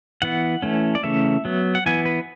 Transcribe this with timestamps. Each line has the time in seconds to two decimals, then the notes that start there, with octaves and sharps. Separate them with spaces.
0.22 E3 B3 F#5
0.62 E3 A3 C#4
0.95 D5
1.03 C#3 E3 A3 C#4 E5
1.45 F#3 B3
1.75 F#5
1.86 E3 B3 G#5
2.05 B4